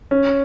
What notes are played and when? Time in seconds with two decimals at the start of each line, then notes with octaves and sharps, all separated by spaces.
0.11 C#4